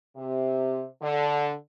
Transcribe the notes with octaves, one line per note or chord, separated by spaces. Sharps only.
C3
D3